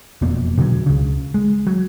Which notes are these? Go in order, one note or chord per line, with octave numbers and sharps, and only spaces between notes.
E1 F2 B2 A#3
B2 D3 E3 F#3
C#2 C#3
G#3
F#3